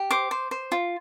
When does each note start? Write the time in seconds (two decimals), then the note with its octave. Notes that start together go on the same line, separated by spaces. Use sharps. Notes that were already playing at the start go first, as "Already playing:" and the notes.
Already playing: G4
0.11 C5 D6
0.31 C5
0.51 C5
0.72 F4